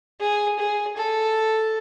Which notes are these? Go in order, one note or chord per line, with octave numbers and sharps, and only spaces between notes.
G#4
G#4
A4